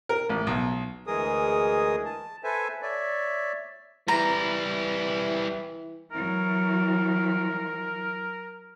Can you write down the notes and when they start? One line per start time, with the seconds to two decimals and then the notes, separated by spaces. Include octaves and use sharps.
0.09 A#4
0.29 A1
0.47 B1
1.07 D2 E3 G#3 G#4 A#4 D#6
2.05 A5
2.44 A4 B4 C5 E5 G#5
2.82 C#5 D5 E5
4.08 E3 G3 E4 A#5
6.12 E3 F#3 A#4